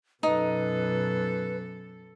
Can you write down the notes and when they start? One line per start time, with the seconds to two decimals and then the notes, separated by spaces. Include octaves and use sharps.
0.23 F#2 B2 D#4 A4 B4